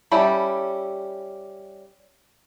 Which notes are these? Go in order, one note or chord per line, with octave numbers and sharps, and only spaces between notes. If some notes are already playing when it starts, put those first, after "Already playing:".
G3 C#4 E4 G4 A4